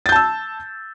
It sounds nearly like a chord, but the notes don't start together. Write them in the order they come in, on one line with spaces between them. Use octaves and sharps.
A6 G6 A5 E6